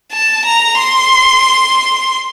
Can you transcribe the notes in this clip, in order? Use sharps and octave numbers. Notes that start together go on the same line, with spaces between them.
A5
A#5
C6